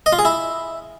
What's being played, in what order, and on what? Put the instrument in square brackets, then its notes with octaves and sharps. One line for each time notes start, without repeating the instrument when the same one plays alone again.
[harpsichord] D#5
F4
G#4
E4